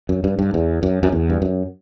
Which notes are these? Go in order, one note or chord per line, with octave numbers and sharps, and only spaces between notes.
F#2
G2
G2
E2
F#2
F#2
E2
G2
F#2